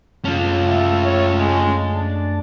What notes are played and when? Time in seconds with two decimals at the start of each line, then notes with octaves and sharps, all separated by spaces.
0.25 F#2 A3 C#4 F4 A5
0.68 E5
1.05 C#5
1.40 G#3
1.96 D4